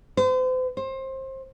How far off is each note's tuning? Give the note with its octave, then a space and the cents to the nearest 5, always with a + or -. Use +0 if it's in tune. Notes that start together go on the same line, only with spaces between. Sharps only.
C5 -40
C5 +25